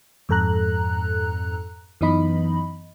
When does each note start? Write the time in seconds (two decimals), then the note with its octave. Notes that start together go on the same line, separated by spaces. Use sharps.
0.29 F2 G#2 A4 A#5 F#6
2.01 F#2 E3 B3 D#4 D#5 B5